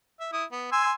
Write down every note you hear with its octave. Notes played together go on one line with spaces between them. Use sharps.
E5
E4 D#6
B3
G#5 C6 E6